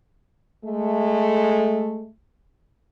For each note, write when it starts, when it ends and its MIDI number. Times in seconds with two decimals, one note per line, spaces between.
0.64 2.09 56
0.64 2.09 57